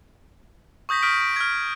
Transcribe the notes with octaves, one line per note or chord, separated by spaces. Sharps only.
C#6 D#6 G6 A#6 B6
C#6 D#6 F6 G6 B6 D7
D7
F6 G#6